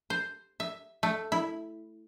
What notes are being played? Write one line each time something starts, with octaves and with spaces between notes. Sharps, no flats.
C5
E5
A3
E4